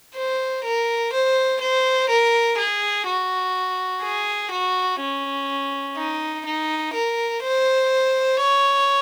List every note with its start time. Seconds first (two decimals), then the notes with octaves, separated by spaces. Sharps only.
0.16 C5
0.64 A#4
1.13 C5
1.61 C5
2.09 A#4
2.58 G#4
3.07 F#4
4.03 G#4
4.51 F#4
5.00 C#4
5.97 D#4
6.46 D#4
6.94 A#4
7.43 C5
8.40 C#5